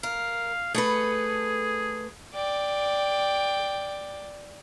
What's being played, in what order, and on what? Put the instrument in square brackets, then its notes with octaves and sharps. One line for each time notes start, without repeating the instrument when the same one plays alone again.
[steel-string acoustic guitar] A#4 [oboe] F5
[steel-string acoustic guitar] A3 A4 B4 [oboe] G#4
[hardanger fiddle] D5 G5